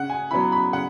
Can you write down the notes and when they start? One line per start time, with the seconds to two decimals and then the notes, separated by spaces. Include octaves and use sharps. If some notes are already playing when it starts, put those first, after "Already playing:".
Already playing: C#3 F#5
0.10 G#5
0.31 F#3 B3 E4 B5
0.52 B5
0.73 C#3 F#5